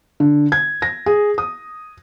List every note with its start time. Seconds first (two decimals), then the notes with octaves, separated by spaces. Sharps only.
0.20 D3
0.52 G#6
0.82 A#6
1.06 G#4
1.38 D#6